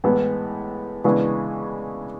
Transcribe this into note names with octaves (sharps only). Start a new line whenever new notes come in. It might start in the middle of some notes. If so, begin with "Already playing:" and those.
A2 E3 G#3 B3
C#3 E3 G#3 B3 D4